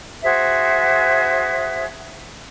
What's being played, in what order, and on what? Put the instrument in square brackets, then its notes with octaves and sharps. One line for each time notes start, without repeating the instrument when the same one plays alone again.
[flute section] F#4 G#4 C5 E5